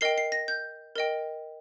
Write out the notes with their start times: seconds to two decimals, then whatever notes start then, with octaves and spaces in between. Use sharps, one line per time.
0.01 A#4 D#5 G5 C7
0.18 C7
0.32 A#6
0.48 G6
0.96 A#4 D#5 G5